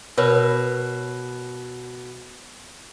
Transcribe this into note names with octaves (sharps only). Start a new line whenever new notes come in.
B2 A#4 B4 C#5